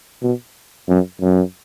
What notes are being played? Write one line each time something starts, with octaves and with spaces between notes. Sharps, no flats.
B2
F#2
F#2